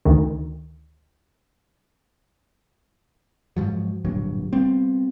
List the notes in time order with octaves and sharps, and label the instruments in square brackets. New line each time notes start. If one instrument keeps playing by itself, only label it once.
[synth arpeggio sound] D2 D#3
[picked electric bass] G#2 F3 F#3
D1 G2 A#2 F#3
G3 B3 C4